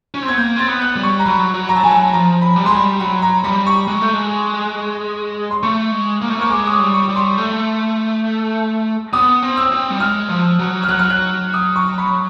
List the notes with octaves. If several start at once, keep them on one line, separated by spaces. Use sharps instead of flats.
C#4
C4
B3 G#6
A#3 G6
C4 A6
B3
F#6
G3
C#6
A#5
F#3 B5
F#3
A#5
A5
F#3 G#5
A5
F3 A#5
B5
G3
G#3 C6
B5
G3
F#3 B5
A#5
G3 B5
C#6
G#3
A3
G#3
C6
A3 C#6
G#3
A#3
A3
A#3 C#6
G#3 D6
D#6
D6
G3
C#6
G3
C6
A3
B3 D#6
C4
E6
C4
G3
G#3 F6
F3
F#3
F6
F#3 F#6
F6
F#6
D#6
C#6
B5